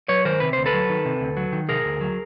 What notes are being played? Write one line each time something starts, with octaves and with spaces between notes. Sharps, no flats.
F#3 B4 C#5
D#3 A#4 C5
C3 B4
D2 C5
A4 B4
F#3
D#3
C3
D2
F#3
D#3
C3 G#4 A#4
D2
F#3